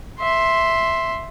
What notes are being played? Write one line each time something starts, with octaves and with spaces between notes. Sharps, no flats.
E5 C6